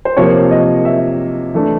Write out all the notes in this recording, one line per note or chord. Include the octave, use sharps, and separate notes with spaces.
C5
C3 F3 A#3 C#5
D#5
E5
E3 A3 D4